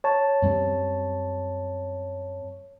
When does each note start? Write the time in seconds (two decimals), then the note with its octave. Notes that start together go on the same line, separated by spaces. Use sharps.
0.04 C#5 A5
0.42 F#2 G3 C4